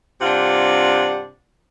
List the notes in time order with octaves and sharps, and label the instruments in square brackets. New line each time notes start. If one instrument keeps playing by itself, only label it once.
[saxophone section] G2 C3 D4 F4 F#5